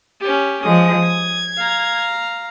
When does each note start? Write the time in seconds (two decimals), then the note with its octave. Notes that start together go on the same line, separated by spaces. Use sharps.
0.21 C#4 G4
0.64 F3 G#3 D#6
1.06 G#6
1.58 F5 A#5